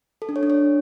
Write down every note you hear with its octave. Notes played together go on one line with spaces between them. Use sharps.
A4
D4
C#5
D4
C#5